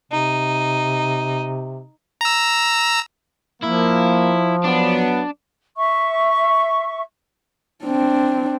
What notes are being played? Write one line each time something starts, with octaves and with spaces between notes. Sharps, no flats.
C3 D#4
A#5 E6
F3 A#3 E4
F#3 B3 D4
E5 C#6
C4 D4